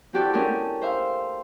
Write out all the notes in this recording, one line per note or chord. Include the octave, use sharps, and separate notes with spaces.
C4 E4 F#4 G4 A4 D5
A3 C#4 D4 G4 G#4 A#4
C5 E5 F5